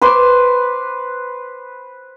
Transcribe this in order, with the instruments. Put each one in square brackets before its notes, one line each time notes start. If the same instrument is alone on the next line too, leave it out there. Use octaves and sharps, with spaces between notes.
[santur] B4 C5 C6 D6